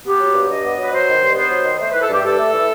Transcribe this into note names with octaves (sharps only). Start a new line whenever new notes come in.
B3 G4
F#3
G2
G2 D#5
B3
F#3
B4
F#3 C5
D#3
G2
B3 C5
F#3
D#3
A3 C5
E3 B4
A4
G2 G4
G2 A4
A3
E3